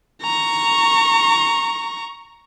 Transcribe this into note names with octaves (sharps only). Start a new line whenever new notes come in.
A#5 C#6